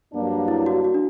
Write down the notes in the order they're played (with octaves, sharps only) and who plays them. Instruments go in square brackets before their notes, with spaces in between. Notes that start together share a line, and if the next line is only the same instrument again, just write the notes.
[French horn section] G2 F#3 A#3 D4
[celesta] E4
F#4
F#4
D4